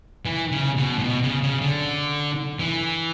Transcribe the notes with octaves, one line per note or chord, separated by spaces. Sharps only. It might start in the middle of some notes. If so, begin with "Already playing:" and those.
E3
C#3
B2
A2
B2
C#3
C#3
D3
E3